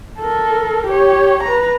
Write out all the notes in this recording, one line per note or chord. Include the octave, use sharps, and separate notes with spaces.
A4 A#4
G4 C#5
B4 A#5